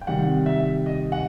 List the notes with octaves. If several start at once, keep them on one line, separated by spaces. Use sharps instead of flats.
G5
C3 D#3 G3 F#5
E5
D#5
F#5